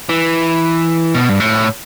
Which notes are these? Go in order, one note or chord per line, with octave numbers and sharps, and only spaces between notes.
E3
B2
G2
A2